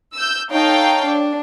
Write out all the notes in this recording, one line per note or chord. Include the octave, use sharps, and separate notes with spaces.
E6 G6
D#4 A4 C#5 F5 G5
D4